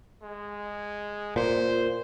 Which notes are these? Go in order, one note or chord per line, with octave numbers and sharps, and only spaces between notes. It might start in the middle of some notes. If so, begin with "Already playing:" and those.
G#3
A#2 C5